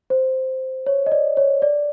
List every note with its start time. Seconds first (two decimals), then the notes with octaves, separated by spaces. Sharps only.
0.10 C5
0.87 C#5
1.06 D#5
1.12 D5
1.37 C#5
1.62 D5